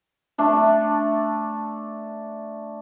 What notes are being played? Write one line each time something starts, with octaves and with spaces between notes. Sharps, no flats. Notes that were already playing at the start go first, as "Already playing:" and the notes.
A3 D4 A5